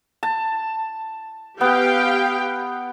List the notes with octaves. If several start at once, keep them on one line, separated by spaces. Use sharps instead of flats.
A5
B3 G4 F5 G5